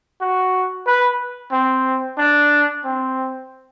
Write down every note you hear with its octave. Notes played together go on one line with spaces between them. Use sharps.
F#4
B4
C4
D4
C4